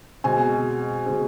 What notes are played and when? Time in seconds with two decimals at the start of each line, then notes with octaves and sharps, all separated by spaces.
0.24 B2 G#3 C4 G#5
1.06 B2 G#3 C4